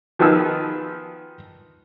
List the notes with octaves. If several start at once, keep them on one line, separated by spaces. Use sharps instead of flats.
D#3 F3 B3 D#4 G#4 E6